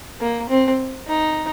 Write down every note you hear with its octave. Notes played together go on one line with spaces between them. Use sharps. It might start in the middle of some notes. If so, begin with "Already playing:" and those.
A#3
C4
D#4